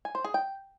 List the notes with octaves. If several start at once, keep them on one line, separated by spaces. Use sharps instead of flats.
G#5
C5
G#4
G5